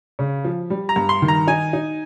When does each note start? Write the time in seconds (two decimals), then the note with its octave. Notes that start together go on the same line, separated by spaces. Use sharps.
0.19 C#3
0.44 F3
0.70 G3
0.89 A#5
0.96 G2
1.09 C6
1.22 D#3
1.28 A#5
1.47 D#4 G#5
1.73 D#4